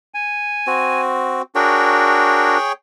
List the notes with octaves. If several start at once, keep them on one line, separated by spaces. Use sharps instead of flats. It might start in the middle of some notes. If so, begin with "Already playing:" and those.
G#5
C4 F#4
D4 F#4 G#4 A#4 C#5 G5